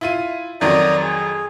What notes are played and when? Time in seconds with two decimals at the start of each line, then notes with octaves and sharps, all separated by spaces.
0.01 E4 F4 D#7
0.61 F2 D#3 F#3 D5 A#5 D#6
1.02 G#4